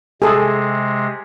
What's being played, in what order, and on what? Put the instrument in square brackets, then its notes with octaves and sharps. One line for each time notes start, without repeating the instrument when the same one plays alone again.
[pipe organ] C3 G#3 [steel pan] G#4 A4